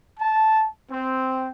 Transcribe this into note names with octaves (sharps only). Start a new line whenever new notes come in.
A5
C4